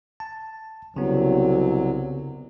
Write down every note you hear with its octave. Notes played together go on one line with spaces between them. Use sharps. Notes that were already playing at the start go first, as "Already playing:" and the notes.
A5
C2 C#3 F#3 B3